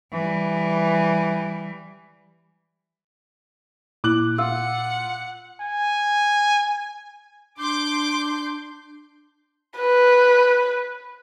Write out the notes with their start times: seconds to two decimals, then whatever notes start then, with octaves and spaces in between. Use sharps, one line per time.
0.11 E3 G3
4.04 A#2 E4 D6 F#6 F#7
4.38 F4 F#5 E6
5.60 G#5
7.58 D4 C6 D6 G6
9.77 B4